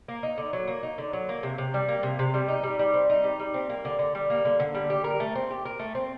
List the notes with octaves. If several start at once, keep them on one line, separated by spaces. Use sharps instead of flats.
A#3
D#4
D3
F#3
A#3
D#4
D3
F#3
A#3
C3
C3
G3
A#3
C3
C3
G3
D#4
G3
G3
C4
D#4
G3
G3
C4
A#3
D3
D3
G3
A#3
D3
D3
G3
G4
A#4
A3
C4
G4
A#4
A3
C4